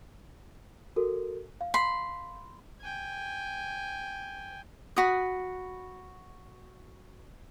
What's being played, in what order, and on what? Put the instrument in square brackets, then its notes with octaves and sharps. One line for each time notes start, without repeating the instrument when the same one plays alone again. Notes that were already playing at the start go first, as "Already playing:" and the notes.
[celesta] F#4 A4 A#4
F5
[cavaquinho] B5 C6
[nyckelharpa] G5 G#5
[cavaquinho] F#4 B5 D#6